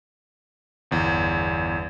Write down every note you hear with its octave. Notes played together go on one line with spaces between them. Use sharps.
G1 E2